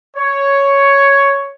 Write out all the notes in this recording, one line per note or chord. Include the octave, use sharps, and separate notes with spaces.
C#5